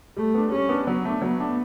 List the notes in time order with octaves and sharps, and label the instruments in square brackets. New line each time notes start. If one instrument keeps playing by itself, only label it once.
[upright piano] G3 [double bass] A3
[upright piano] B3 D4
[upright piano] G3 [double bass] C#4
[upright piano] B3 D4
[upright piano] F#3 [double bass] B3
[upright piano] A3 D4
[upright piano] F#3 [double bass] B3
[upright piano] A3 D4